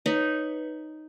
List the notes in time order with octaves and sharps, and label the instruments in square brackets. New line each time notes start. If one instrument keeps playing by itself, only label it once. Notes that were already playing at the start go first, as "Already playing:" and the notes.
[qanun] D#4 [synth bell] B4 C#5